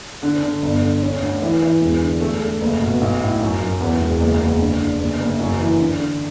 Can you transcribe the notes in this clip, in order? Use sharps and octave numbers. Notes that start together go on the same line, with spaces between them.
D3
D3
G1
D3
C#4
D2
E3
E3
E1
D3
A3
A3
F#1
B2
B1
A2
F#2
F#2
E2
E1
F#1
F#1
D3
D3
F#1
F#1
F#2
E3
D3
D3